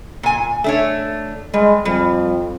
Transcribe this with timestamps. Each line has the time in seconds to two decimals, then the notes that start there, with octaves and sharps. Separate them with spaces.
0.23 A#2 G#5
0.64 A3 D4 C#5
1.54 G3 G#3
1.85 F2 G3